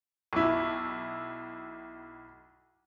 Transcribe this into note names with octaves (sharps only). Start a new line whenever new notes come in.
B1 E4